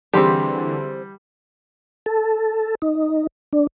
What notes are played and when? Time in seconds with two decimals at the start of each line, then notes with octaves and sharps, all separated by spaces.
0.14 D3 E3 G3 C4 G4 G#4 C6 C7
2.06 A4
2.82 D#4
3.53 D4